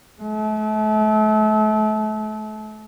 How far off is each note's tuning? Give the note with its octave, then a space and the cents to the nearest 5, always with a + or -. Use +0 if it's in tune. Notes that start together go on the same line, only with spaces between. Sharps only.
A3 -35